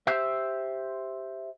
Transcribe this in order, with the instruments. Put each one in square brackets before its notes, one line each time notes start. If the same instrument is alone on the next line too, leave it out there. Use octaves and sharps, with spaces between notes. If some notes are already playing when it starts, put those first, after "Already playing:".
[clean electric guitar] G4 C5 E5